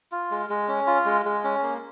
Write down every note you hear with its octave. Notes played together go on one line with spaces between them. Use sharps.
F4
G#3
G#3
C#4
F4
G#3
G#3
C#4
A#3